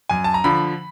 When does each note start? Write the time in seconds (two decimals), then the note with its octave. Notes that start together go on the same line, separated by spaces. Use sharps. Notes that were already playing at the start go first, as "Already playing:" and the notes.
0.09 F#2 G#5
0.24 A5
0.34 A#5
0.44 D3 F3 B5